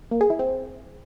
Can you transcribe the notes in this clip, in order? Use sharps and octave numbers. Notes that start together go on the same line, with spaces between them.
A#3
G#4
E4
C4